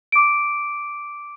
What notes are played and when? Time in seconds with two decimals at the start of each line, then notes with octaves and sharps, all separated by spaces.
0.12 D6 D7